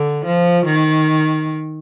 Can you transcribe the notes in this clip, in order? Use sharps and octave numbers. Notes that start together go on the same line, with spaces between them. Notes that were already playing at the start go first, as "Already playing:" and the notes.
Already playing: D3
F3
D#3